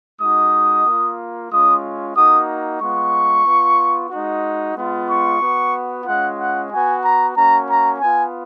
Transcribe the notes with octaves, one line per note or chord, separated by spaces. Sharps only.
G#3 D#4 F#4 D#6
A#3 F4
G#3 C#4 F4 D#6
A#3 D#4 F#4 D#6
G#3 B3 F4 C#6
B3 F4
G#3 D#4 F#4
G#3 B3 F4
C#6
B3 F#4
G#3 C#4 F4 F#5
F#5
B3 F#4 G#5
A#5
A#3 C#4 F#4 A#5
A#5
B3 F4 G#5